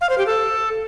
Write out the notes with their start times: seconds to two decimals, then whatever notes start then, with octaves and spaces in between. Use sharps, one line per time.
0.01 F5
0.10 C5
0.18 G4
0.27 A4